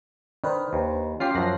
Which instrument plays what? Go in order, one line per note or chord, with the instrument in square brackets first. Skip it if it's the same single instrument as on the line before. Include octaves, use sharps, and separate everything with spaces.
[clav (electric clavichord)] D#3 [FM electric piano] D4 B4 C5
[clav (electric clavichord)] D#2
[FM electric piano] C#4 C7 [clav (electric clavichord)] F4 G4
[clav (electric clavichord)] F#2 F3 [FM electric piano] F#6 A#6 C7